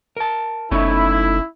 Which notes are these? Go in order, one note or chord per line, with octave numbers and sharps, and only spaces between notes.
A#4 A5
F#1 A3 C#4 D#4 E4